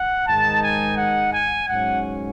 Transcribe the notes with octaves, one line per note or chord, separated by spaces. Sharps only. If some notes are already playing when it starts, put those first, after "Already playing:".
Already playing: F#5
G#2 D#3 G#3 D#4 A5
G#5
F#5
G#5
G#2 F#3 C#4 F#5